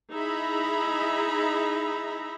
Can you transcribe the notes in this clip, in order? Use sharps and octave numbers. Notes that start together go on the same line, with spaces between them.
D#4 E4 G#4 E5 A#5 B5